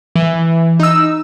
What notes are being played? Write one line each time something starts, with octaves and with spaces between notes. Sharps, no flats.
E3
D#4 E6